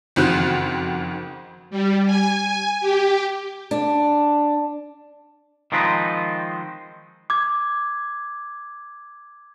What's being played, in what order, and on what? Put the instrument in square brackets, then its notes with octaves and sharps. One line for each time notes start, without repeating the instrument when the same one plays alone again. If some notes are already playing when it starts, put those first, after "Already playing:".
[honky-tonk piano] F#1 F2 D#3 C4 F#4 F#6
[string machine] G3
G#5
G4
[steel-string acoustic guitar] D4
[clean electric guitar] D#3 F3 G#3 C4 D#4 B4
[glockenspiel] D6 G#6